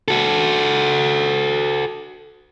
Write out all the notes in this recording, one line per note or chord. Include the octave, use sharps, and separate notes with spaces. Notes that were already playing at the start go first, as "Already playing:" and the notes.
F#4 A4